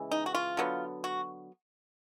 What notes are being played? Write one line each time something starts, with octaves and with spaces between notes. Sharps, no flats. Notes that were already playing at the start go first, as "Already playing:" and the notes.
Already playing: C#3 E3 G#3
D#4
F#4
F4
D3 F#3 B3
F#4